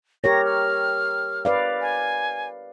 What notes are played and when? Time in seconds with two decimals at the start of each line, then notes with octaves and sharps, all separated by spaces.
0.24 G4 A#4 C#5 A#6
0.46 F6
1.45 B4 D5 F5
1.81 G#5